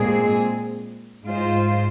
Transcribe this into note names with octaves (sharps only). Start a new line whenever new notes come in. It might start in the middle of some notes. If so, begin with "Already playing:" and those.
Already playing: A#2 G#3 C4 G#4
G#2 G#3 F4 C5